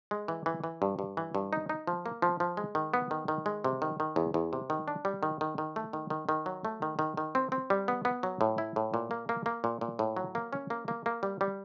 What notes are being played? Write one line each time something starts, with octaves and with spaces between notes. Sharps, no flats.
G#3
E3
E3
E3
G2
G2
E3
G2
D#4
D#4
F3
A#3
F3
F3
G#3
D#3
B3
D#3
D#3
G#3
C3
D#3
D#3
E2
E2
C3
D#3
D4
G3
D#3
D#3
D#3
A3
D#3
D#3
D#3
F#3
A3
D#3
D#3
D#3
C4
C4
G3
B3
B3
F#3
A2
E4
A2
A#2
A#3
A#3
A#3
A#2
A#2
A2
F#3
A#3
C#4
A#3
A#3
A#3
G3
G3